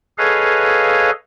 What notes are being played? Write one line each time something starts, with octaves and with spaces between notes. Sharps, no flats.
G#4 A4 B4 C#5 D#5 F5